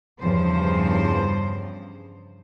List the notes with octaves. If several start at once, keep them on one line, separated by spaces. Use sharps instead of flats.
E2 G2 C#3 F3 C5